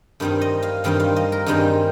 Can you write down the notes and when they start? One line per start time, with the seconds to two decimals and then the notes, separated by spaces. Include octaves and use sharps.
0.20 G2 D#3 G3 C4 D#4
0.41 D#5
0.63 F5
0.84 G2 D#3 G3 C4 D#4 F5
1.00 F5
1.16 D#5
1.32 A#4
1.46 G2 D#3 G3 C4 D#4 G#4